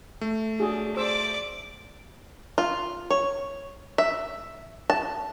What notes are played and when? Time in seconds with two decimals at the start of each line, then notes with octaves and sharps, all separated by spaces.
0.21 A3
0.60 D4 F#4 G#4
0.97 C5 D5 D6 E6
2.58 F4
3.11 C#5
3.98 E5
4.90 A5